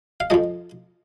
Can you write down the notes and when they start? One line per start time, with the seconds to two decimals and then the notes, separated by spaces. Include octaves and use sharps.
0.20 F5
0.30 F2 F3 G#3 D#5